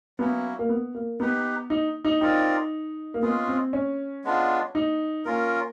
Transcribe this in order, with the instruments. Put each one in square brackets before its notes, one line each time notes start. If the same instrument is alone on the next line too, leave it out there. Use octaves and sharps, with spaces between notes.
[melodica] F#3 A#3 C#4 E4 [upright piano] B3
[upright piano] A#3
B3
A#3
[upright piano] B3 [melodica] D#4 G4 B4
[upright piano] D#4
D#4
[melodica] C4 F4 A#4 D5 [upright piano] D#4
[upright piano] A#3
[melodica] G#3 C#4 F4 G#4 [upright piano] B3
[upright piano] C4
C#4
[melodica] G#3 B3 D4 F4
[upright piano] D#4
[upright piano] A#3 [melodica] C#4 F4 A#4